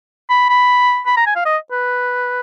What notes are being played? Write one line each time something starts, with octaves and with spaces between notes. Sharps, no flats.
B5
B5
B5
A#5
G#5
F5
D#5
B4